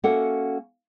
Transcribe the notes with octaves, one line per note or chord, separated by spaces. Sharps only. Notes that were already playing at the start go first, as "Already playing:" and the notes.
A#3 C#4 F#4 A4 E5 F#5